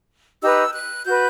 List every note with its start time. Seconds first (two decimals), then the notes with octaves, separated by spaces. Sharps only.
0.42 D#4 G4 B4 E6
0.74 F#6
1.04 F#4 B4 G6